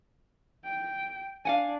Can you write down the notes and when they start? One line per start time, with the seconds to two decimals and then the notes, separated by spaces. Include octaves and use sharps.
0.64 G5
1.45 D4 F5 F#5 G#5